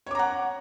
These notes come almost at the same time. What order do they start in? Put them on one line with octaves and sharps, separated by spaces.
C#5 D6 A#5 F#5